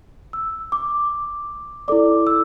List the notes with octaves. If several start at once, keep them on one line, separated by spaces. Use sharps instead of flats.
E6
D6
E4 A4 D5 D6
E6